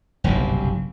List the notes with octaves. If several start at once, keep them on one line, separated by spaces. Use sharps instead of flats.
F#1 B1 G2 C3